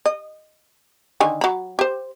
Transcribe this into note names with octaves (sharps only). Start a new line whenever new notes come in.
D#5
D3 D#3 G#5
F#3 B5
G4 C5